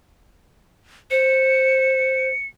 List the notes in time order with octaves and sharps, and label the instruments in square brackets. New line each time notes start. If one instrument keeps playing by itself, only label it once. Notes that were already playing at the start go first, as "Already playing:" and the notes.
[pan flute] C5 [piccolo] C#7